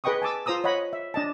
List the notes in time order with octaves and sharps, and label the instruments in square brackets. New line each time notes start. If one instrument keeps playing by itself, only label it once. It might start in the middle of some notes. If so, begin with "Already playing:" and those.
[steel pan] G#4 B4 D#5 G5 C#6 D#6
G#5 A5 D6 E6
F4 C5 A#5 D#6 E6
C#5 D#5 F#5 B5
E5
D4 D#5 A5